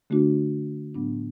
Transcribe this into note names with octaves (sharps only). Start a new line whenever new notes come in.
D3 A3 D4 F#4
A2 F#3 B3 D4